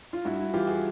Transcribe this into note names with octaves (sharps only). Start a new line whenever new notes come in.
F4
G2 E4 F#4
E4 F#4
E3 F4 G4
F#4 G#4